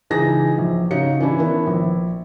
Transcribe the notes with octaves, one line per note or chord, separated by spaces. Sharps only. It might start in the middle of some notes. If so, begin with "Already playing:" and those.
C#2 E3 D#4 G#4 A#6
A#1
C#3 D#4 F#4 C#5 C#7
E3 C#4 D4 E4
D#3 B3 E4
A#1